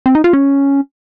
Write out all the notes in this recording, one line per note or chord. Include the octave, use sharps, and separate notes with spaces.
C4
D#4
F4
C#4